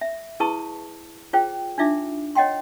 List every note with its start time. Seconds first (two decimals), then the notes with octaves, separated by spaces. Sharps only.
0.01 E5
0.40 E4 G#4 B4 A5 C#6 D#6
1.33 F4 G#4 C5 G5
1.78 D4 D#4 F4 E5 D6
2.35 C#5 D#5 F#5 G5 C6